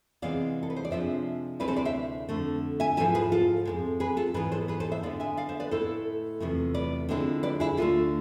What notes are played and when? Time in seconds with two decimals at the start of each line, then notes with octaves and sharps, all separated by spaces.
0.22 C3 E3 G#3 B3 D5 F5
0.63 A4
0.70 B4
0.76 C5
0.85 D5
0.91 C3 F3 G#3 D4 C5 E5
1.60 D2 C3 G#3 C4 E4 B4 D5
1.68 A4 C5
1.76 B4 D5
1.85 C5 E5
2.29 F2 D3 A3
2.80 E5 G#5
2.97 G#2 F3 B3 E4 E5 G#5
3.15 G#4 B4
3.32 F4 A4
3.65 F2 C3 G#3
4.00 G#4 B4
4.17 F4 A4
4.34 G#2 E3 B3 G#4 B4
4.52 A4 C5
4.68 G#4 B4
4.80 A4 C5
4.92 C5 E5
5.03 D3 G#3 B3 D5 F5
5.20 E5 G#5
5.37 D5 F5
5.49 C5 E5
5.60 B4 D5
5.71 A2 G#3 B3 E4 A4 C5
6.40 E2 C3 F3 A3
6.74 B4 D5
7.09 D3 F3 G#3 C4 E4
7.43 B4 D5
7.60 E4 G#4
7.77 D2 D3 A3 F4